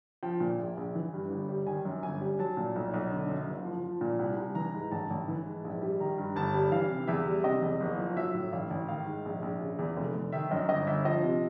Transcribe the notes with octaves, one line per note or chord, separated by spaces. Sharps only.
F3 G5
A#2
A#1
A#1
E3
G2
G1
G3
D#3 G#5
F#2
G1 G#5
G3
F#3 A5
A#2
B1
B1
D3
F#2
F#1
F3
F3
A#2
C2
C2
E3 A#5
G#2
A1 A5
A1
E3
G#2
A#1
G3
D#3 A#5
G2
G1 A5
G3
E3 F5
C3
E2 E5
G3
C3 D#5
E2
F#1
F3
F#3 E5
A2
A1 F5
A1
D#3 F5
G#2
A#1
A#1
C#3
E2
F1
F1
D#3 E5
F#2 D#5
G1 D#5
G1 E5
F3 D#5
C3